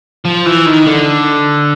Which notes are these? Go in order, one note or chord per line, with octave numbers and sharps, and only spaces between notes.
F3
E3
D#3
D3